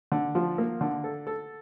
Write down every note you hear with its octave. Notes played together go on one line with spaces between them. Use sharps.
D3
F3
A#3
D3
A4
A4